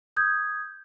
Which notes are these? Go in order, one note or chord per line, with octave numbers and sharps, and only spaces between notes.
D#6 G6 G#6